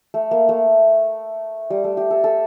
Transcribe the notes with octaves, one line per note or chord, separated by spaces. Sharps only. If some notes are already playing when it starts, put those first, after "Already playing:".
A3
A#3
A3
G3
A3
G4
A4
A4